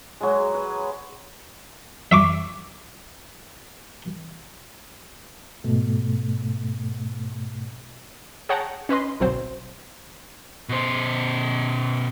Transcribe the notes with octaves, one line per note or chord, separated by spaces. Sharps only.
F#3 G#3
B4
E5 C#6 D6
G#2 B2 A3
G#4 C#5 F#5 G5 A5 A#5
C#4 B4 D#5 C6
G1 C2 B2 F#3 C4 C5
B2 C5